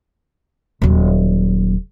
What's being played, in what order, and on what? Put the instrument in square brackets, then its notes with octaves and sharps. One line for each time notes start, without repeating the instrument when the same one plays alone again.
[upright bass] D#1 F#3